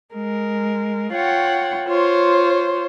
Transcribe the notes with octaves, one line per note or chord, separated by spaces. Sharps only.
G#3 A#4
F4 C#5 F#5 G5
F4 C5 C#5